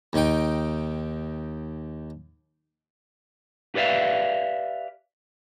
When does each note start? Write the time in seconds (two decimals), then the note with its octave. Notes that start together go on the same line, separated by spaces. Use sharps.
0.13 D#2 D#4 G5
3.75 G4 B4 D5 E5 F5